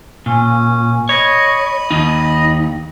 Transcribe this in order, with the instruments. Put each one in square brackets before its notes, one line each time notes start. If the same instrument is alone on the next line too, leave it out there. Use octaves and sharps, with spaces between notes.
[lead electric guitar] A#2 [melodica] C#4
[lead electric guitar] C#5 [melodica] D#5 B5
[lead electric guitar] D#2 D#4